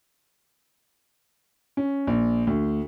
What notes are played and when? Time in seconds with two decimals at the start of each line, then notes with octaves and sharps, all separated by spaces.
1.77 C#4
2.07 A#1
2.47 D2